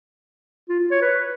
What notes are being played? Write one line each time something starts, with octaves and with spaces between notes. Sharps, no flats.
F4
F4
C#5
B4